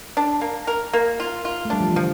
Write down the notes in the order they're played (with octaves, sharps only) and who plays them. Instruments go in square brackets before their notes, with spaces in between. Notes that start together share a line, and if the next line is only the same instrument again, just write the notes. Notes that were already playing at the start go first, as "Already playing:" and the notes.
[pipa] D4
A#3
A#4
A#3
F4
F4
[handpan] A3
[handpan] G3 [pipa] D4
[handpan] F3
E3
[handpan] D3 [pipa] F3